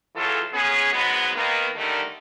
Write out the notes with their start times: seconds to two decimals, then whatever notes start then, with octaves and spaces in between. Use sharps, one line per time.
0.16 C#3 E3 F#3 F4 A4
0.53 B3 C#4 G#4
0.93 G#2 F#3 G#3 B3
1.35 D#3 A#3 B3
1.76 D3 D#3 G3 A3 D#4 A#4